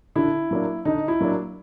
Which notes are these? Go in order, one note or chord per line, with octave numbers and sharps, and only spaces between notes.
D3 E4
F#3 A#3 D4
D3 D#4
E4
F#3 A#3 D4